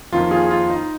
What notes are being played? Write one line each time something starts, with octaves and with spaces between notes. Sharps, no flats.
F2 D#3 A#3 F4
F4 G#4
F4
D#4